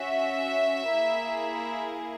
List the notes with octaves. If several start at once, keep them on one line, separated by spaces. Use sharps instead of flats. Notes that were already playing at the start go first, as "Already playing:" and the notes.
Already playing: C#4 F#4 E5
A#3 E4 G#4